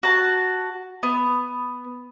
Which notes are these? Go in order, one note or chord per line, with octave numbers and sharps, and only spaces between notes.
F#4 A5
B3